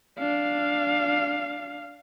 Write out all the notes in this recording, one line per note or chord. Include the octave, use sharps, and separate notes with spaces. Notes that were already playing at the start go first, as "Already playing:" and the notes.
D4 F5